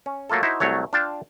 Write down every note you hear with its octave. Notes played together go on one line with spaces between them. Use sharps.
C#4
F#3 A3 A#3 F4 A4
D#4 E4 F#4 C5 E5
C2 F#3 A3 C#5
D4 F4 F5 G5 A5